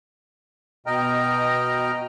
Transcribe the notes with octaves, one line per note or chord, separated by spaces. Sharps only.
B2 D#5 G5 A#5 F6